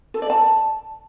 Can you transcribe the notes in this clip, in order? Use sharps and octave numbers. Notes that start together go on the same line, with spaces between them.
A4
D5
A5